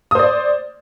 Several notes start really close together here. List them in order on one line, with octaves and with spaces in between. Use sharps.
D#6 C5 D5